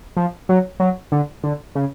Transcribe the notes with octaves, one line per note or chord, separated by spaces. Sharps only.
F3
F#3
F#3
D3
D3
C#3